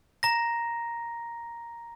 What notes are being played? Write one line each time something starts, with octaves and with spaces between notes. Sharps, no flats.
A#5 A#6